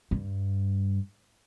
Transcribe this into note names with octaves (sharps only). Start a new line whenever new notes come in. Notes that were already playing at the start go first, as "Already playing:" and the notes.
G2